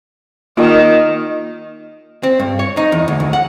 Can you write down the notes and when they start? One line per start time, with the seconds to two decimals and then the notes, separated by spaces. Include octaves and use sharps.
0.57 D#3 A#3 F4
2.23 C4
2.40 G2
2.59 C#5
2.77 D#4
2.92 E2
3.08 D2
3.20 D2
3.33 F#5